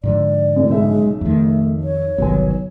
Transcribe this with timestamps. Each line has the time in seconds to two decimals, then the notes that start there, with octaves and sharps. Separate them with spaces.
0.04 G#2 D3 F3 D5
0.56 F#2 A2 C3
0.70 B1 C#3 G#3 E5
1.21 F2 D#3 A3
1.83 C#5
2.18 G1 C2 D#3 F#3 B3 G#5